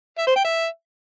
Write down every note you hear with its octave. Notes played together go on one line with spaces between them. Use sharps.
E5
C5
G5
E5